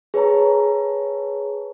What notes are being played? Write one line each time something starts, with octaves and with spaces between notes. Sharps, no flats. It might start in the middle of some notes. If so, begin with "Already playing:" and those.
G#4 B4 C#5 A5 A#5